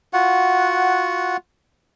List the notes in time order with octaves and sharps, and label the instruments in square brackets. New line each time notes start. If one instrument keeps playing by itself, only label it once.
[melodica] F4 F#4 F#5